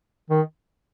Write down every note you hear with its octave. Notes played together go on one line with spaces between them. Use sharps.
D#3